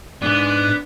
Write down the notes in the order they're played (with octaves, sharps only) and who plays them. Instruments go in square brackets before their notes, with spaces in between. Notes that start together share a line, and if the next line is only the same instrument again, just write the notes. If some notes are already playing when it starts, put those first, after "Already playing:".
[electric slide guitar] G#2 G#3 [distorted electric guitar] B3 [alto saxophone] D4